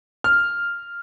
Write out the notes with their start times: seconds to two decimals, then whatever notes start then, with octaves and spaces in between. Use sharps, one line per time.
0.24 F6